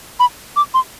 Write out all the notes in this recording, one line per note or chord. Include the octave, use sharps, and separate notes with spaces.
B5
D6
C6